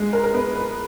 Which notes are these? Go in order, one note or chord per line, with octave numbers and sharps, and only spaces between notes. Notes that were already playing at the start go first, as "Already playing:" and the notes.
Already playing: G#3
A#4
A#4
B3 B4
B4